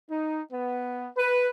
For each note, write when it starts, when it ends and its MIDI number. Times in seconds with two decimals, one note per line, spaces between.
0.10 0.42 63
0.52 1.10 59
1.17 1.49 71